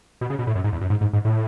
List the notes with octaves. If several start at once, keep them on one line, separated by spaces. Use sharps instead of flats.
B2
C#3
B2
A2
F#2
G#2
E2
F#2
G#2
G#2
G#2
A2